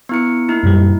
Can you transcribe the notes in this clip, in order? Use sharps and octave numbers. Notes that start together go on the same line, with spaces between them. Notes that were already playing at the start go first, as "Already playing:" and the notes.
B3 E4 C#7
A#3 D#4 E4
F#2 A#2 G3